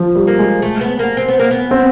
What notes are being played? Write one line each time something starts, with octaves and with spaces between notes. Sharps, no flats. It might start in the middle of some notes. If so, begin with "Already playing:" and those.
Already playing: F3
G3
A#3
G#3
A3
B3
A#3
C4
B3
A#3
B3
C4